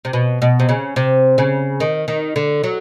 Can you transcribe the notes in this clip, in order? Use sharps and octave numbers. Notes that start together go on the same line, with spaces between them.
C3
B2
B2
C3
C#3
C3
C#3
D#3
D#3
D3
F#3